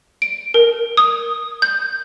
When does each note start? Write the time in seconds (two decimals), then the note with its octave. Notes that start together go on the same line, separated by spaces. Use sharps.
0.22 D7
0.54 A#4
0.97 D#6
1.62 G6